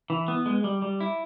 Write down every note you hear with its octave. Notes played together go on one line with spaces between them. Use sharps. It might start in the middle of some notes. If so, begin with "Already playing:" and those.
E3
B3
G#3
G3
G3
E4